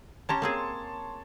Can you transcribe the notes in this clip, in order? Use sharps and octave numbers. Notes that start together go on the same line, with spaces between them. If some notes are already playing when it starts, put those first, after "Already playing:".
C#4 G4 C#5 A5 A#5 C6
A#3 C4 G#4